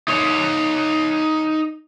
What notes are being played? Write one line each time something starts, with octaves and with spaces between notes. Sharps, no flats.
D#4 C#5